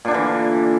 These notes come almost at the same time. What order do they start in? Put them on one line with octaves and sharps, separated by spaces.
A#2 D4 D3 E3